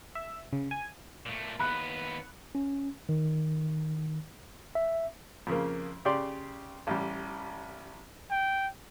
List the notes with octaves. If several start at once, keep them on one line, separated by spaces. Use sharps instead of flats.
E5
C#3
G#5
A#2 A3
D#2 B3 B5 F#6
C#4
D#3
E5
F2 C#3 A#3
C#3 G4 D5 C6
A1 G3
G5